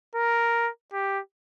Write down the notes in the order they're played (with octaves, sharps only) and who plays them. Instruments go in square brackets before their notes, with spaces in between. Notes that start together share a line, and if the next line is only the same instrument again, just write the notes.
[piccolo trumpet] A#4
G4